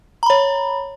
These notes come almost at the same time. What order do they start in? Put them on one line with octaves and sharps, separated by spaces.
A#5 B5 C#5